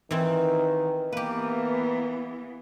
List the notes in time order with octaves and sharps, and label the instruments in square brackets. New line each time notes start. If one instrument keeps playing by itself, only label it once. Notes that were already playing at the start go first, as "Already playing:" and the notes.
[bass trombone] D#3 [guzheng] E3 C4
[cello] E3 B3 [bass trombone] A#3 [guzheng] G4 B4